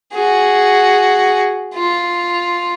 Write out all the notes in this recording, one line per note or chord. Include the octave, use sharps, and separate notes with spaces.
F#4 G#4
F4